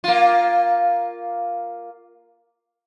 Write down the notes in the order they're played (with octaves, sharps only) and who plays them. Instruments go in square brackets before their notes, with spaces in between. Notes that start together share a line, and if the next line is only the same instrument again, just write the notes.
[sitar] A#3 F4